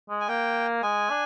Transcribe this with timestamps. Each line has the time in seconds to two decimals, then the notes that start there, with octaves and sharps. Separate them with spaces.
0.09 G#3
0.20 G#5
0.28 A#3 G5
0.83 G#3 G#5
1.10 D4